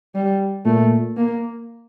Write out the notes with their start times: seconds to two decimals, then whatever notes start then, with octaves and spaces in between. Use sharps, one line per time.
0.15 G3
0.65 A#2 A3
1.17 A#3